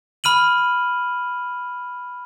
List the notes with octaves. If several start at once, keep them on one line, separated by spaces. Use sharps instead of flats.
B5 F6 D#7 F#7